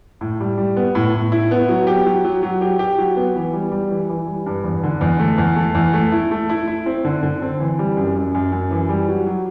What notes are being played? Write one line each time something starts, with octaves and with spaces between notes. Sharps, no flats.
A2
G3
G3
B3
A2
A2
E4
B3
F#3
G4
F#3
F#3
F#3
G4
G4
F#3
B3
E3
G3
G3
E3
E3
G3
G2
E2
D3
E2
A3
E2
A3
E2
A3
E4
A3
E4
E4
C4
D3
D3
C4
E3
G3
F#2
F#2
F#2
F#2
E3
G3
F#3
F#3